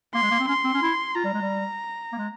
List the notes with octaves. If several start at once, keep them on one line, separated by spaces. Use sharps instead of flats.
A#3 C6
G#3
A#3
C4
C#4 C6
C4
C#4
E4
F4 A#5
G3
G#3
G3
A#3
G#3